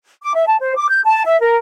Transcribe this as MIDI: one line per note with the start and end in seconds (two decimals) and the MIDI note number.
0.22 0.34 86
0.34 0.44 76
0.46 0.57 81
0.60 0.75 72
0.75 0.87 86
0.89 0.99 91
1.05 1.22 81
1.25 1.39 76
1.40 1.55 70